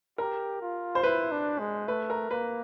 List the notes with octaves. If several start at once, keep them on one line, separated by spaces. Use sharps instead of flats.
G4 A#4
F4
C5
E4 B4
D4
G#3
A3 B4
A#4
A#3 B4